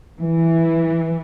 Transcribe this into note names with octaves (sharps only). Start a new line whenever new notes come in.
E3